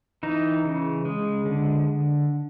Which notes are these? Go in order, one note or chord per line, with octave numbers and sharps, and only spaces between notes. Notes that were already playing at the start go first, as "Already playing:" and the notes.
E3 D#4
C#3
G#3
D3